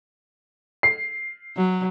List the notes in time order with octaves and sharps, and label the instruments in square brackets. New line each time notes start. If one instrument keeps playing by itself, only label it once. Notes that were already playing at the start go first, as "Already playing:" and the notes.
[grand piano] C7
[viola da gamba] F#3